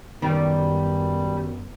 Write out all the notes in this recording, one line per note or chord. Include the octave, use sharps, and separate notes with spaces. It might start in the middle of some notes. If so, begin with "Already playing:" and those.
F#2 D#3 G3 B3